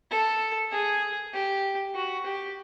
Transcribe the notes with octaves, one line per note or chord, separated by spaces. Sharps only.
A4
G#4
G4
F#4
G4